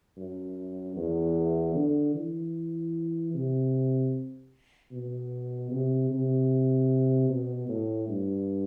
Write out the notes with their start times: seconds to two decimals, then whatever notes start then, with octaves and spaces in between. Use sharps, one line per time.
0.17 F#2
0.96 E2
1.75 D3
2.15 E3
3.34 C3
4.92 B2
5.71 C3
6.10 C3
7.29 B2
7.68 A2
8.08 G2